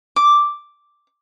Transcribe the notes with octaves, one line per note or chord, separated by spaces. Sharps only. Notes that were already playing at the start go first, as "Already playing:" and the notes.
D6